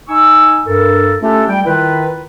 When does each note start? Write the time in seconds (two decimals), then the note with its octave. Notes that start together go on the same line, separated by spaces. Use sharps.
0.08 D#4 G#5 C#6 E6
0.66 G2 A4 A#4
1.20 A3 C#4 D4 F4 G4 A4
1.48 G3 G5
1.65 D#3 E4 F4 B4